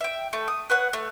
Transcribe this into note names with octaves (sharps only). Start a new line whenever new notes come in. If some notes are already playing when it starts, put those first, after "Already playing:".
E5 G5
A3 A4
D#6
B4 C#5 F#5
A3